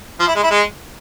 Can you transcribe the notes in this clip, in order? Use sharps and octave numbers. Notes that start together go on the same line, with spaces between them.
F3
E4
G#3
E4
G#3